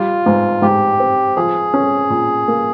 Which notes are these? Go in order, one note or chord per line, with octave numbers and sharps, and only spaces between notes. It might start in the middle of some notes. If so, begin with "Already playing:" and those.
Already playing: G3 F4
G#2
G#2 G4
C4
F3 G#4
C#4
A#2
A#3